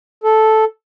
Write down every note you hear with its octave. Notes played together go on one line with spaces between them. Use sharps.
A4